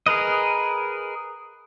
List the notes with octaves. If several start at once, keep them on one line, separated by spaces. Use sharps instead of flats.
G#4 A#4 B4 D#5